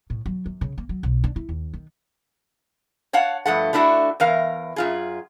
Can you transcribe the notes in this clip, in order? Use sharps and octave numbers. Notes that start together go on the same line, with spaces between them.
A2
F#3
F#2
C#3
A#3
F#3
B1
D4
E4
D#2
D#3
C#5 F5 F#5 A5
G2 F3 A3 F#5
A3 D4 E4 F#4
E2 E3 A#4 F5
F#2 F4 G#4